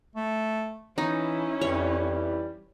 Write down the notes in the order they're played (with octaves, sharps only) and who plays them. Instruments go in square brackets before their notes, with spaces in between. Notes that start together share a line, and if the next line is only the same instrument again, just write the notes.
[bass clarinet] A3
[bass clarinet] E3 [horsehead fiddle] C#4 E4 [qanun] D#4
[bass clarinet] F2 [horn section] E3 G3 [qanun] C#5